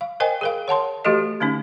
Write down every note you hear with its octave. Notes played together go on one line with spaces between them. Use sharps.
F5
A#4 C5 D#5 G5 G#5
G#4 A#4 F5
C#5 F#5 A5 C6
E3 A3 F#4 G4 A4 D#5
D3 A3 C#4 D#4